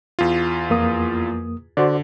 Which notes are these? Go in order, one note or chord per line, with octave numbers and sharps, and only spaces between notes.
E2 F4
F2 A#3 D#6
D3 F#4 C5 D5